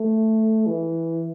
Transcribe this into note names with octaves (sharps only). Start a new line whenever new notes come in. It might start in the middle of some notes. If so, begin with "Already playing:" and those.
Already playing: A3
E3